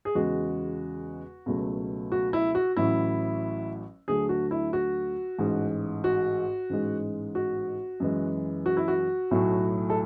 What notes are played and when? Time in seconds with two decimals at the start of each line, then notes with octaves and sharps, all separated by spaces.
0.05 G#4
0.15 E2 C#3 G#3 F#4
1.46 C#2 B2 F#3 A3
2.12 F#4
2.33 E4
2.55 F#4
2.77 A1 A2 F#3 E4
4.08 D2 D3 F#3 A3 G#4
4.29 F#4
4.51 E4
4.73 F#4
5.38 A1 G#2 G#3
6.04 F#4
6.70 A1 G#2 G#3
7.35 F#4
8.00 F#2 E3 G#3
8.66 F#4
8.77 E4
8.88 F#4
9.31 B1 A2 F#3 A3
9.90 A4